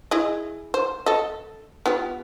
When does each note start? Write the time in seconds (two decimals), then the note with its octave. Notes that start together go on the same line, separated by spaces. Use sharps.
0.11 E4 G#4 D#5
0.74 C5
1.06 A4 D#5
1.86 B3 F4 G4